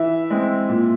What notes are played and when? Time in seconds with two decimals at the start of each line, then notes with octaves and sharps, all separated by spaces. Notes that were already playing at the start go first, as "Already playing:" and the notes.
Already playing: E3 E5
0.30 G#3 C4
0.69 A#2